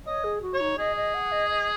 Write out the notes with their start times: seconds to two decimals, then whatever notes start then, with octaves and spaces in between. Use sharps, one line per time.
0.06 C#5 D#5
0.24 G#4
0.42 F#4
0.54 C#5
0.60 D#4
0.78 G#4 D#5
0.96 D#5
1.14 F#5
1.32 D#5
1.49 D#5